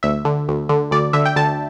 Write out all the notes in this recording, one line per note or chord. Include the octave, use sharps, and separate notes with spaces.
D2 E5
D3
D2
D3
D2 D5
D3 E5
G5
D2 A5